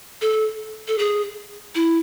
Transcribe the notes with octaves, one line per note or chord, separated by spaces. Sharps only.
A4
A4
G#4
E4